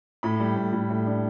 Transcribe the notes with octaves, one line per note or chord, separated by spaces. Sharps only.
A2 B5
G3
A2
A2
A2
D4